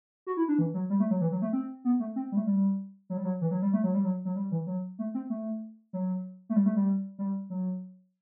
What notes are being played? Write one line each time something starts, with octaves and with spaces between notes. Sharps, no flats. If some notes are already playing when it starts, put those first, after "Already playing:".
F#4
E4
D4
E3
F#3
G3
A3
F#3
E3
F#3
A3
C4
B3
A3
C4
G3
A3
G3
F#3
G3
F#3
E3
F#3
G3
A3
F#3
G3
F#3
F#3
G3
E3
F#3
A3
C4
A3
F#3
A3
G3
A3
G3
G3
F#3